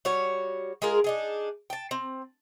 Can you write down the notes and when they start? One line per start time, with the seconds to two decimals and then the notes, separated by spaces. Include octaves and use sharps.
0.05 G3 F#4 C#5
0.82 G#3 F4 G#4 A#4
1.04 D4 D#4 G#4
1.70 G5 A5
1.91 C4